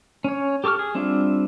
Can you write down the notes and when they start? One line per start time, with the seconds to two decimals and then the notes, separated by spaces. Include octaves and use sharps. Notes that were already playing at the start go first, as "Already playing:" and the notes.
0.24 C#4 C#5
0.64 G4 A4 C#6 D6 F6
0.79 G#4
0.95 G3 C4 D4 F4 E5